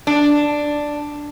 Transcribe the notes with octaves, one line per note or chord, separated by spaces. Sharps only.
D4